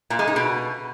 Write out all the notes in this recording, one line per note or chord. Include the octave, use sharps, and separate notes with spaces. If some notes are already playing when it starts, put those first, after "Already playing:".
A#2
G#3
D#4
B2